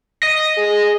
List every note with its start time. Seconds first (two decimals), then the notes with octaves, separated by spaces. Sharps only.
0.23 D#5
0.57 G#4